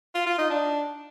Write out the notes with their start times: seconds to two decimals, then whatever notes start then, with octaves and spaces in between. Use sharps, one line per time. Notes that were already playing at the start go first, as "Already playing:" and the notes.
0.15 F4
0.27 F4
0.38 D#4
0.50 D4